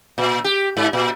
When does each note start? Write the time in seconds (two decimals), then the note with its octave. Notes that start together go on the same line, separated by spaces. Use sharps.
0.18 A#2
0.44 G4
0.77 G#2
0.93 A#2